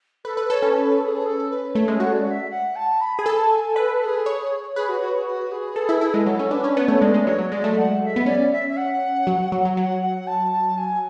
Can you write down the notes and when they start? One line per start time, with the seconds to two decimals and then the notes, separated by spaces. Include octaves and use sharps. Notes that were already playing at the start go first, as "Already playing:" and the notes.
0.25 A4 B4
0.37 B4
0.50 A4 C#5
0.62 C#4
0.75 B4
1.00 A4
1.05 G#4
1.26 A4
1.50 B4
1.75 A3 C#5
1.88 G#3 A4
2.00 F#4 C#5
2.13 D5
2.25 F#5
2.30 E5
2.50 F#5
2.76 A5
3.01 B5
3.19 G#4
3.25 A4 A5 B5
3.51 G#5
3.76 A4 B4
4.01 A4
4.05 G#4
4.26 C#5
4.76 G#4 B4
4.88 F#4
5.00 F#4
5.13 G#4
5.26 F#4
5.51 G#4
5.76 A4
5.89 E4
6.01 E4
6.14 G#3
6.26 F#3 A4
6.39 C#4
6.51 D4 B4
6.64 C#4
6.76 B3 C#5 D5
6.88 A3
7.01 G#3 D5
7.14 G#3
7.27 F#3 C#5
7.39 F#3
7.51 G#3 D5
7.64 A3
7.77 F#5
8.02 F#5
8.06 E5
8.16 B3
8.26 C#4 D5
8.52 E5
8.69 E5
8.77 F#5
9.27 F#3
9.52 F#3
9.65 F#3
9.77 F#3 F#5
10.02 F#5
10.27 A5
10.52 A5
10.78 G#5